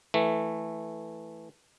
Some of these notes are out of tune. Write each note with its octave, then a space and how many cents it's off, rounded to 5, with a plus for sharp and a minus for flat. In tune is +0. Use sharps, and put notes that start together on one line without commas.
E3 +0 A3 +0